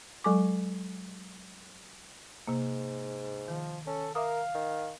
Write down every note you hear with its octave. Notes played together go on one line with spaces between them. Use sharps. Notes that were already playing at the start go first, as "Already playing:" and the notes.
F#3 G#3 A4 G#5 C#6 D6
G#2 C3 A#3
D#3 F3
C#4 A4
A#4 E5 F5 D6 D#6
D#3